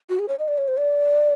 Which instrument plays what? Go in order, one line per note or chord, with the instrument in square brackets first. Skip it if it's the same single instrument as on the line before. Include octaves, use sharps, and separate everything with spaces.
[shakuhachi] F#4
G#4
C#5
D#5
D5
C#5
C5
D5